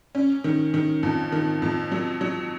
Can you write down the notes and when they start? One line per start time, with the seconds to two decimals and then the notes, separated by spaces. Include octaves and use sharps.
0.15 C#4
0.44 D#3
0.74 D#3
1.03 F2
1.32 D#3
1.62 F2
1.92 F#3
2.21 F#3